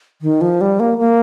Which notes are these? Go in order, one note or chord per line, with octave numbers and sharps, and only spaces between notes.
D#3
F3
G3
A#3
A#3